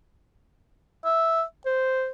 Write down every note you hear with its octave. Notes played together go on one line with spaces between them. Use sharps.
E5
C5